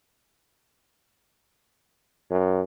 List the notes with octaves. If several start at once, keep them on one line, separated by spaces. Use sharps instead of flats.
F#2